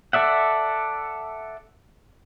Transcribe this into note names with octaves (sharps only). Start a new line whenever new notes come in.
A4 D5 E5 F#5